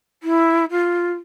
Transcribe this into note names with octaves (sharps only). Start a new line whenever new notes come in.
E4
F4